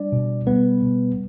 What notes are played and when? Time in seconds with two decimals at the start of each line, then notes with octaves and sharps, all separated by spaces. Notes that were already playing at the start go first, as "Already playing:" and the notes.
Already playing: G3 D4 D5
0.12 B2
0.47 G3 B3 B4
0.83 B2